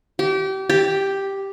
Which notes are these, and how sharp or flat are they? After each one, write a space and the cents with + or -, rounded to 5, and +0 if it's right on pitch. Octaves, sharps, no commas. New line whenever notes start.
G4 -30
G4 +0